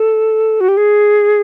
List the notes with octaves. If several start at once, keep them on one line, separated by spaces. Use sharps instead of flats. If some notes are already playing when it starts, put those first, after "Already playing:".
Already playing: A4
F#4
G4
G#4